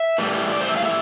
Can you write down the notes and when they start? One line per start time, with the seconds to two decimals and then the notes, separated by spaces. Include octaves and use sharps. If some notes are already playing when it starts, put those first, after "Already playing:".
Already playing: E5
0.18 A2 E3 G3
0.52 D5
0.61 C5
0.69 E5
0.77 F5
0.85 E5